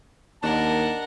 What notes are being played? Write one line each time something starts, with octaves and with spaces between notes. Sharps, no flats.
D#2 D#3 D4 A#4 F#5 A5